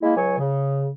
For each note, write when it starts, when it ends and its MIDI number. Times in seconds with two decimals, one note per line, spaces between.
0.01 0.15 56
0.01 0.15 58
0.01 0.15 64
0.15 0.33 37
0.15 0.33 54
0.15 0.33 73
0.15 0.33 80
0.38 0.88 49